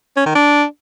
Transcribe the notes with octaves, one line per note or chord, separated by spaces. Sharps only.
C#4
D#3
D4